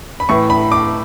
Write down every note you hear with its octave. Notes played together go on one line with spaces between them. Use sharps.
B5
A2 E3 C#6
B5
D6